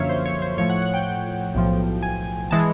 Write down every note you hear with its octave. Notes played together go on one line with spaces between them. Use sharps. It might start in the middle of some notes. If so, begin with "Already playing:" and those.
Already playing: F#2 D3 F3 A#3 C#5 E5 F5
C5
C#5
C5
A2 F3 A3 C#5
F#5
F#5
G5
B1 A2 F3
G#5
E3 G#3 A5